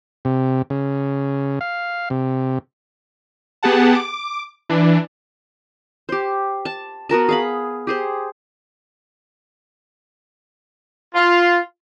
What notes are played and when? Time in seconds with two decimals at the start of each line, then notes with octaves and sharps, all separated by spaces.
0.25 C3
0.70 C#3
1.61 F5
2.10 C3
3.63 B3 G4 G#4 F#5 A5
3.95 D6
4.69 E3 D4
6.09 G4 C5
6.65 A5
7.09 B3 F#4 A#4 A5
7.29 G#4 F5 B5
7.87 G4 G#4 C5
11.14 F4